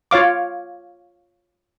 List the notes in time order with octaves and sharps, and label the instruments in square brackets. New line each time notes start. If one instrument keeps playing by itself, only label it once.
[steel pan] F4 C#5 F5 D6